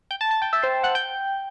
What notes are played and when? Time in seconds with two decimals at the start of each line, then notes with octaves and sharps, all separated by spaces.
0.11 G5 G6
0.21 A5 A6
0.31 A5 A6
0.42 G5 G6
0.53 E5 E6
0.62 C5 C6
0.83 F#5 F#6
0.95 G5 G6